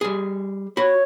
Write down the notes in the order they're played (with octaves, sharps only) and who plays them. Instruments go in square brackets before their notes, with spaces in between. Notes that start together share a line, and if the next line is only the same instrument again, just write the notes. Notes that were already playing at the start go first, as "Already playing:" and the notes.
[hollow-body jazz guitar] G3 G#4
[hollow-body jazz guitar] F#4 B5 [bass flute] C#5